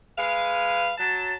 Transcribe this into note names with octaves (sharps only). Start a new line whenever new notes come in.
G#3 B4 F5
F#3 A5